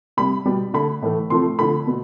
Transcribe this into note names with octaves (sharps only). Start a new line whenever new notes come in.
C3 G3 B5
B2 G3
D3 A3 B5
A2 E3 A3
C3 F3 A3 C6
D3 F3 A3 B5
B2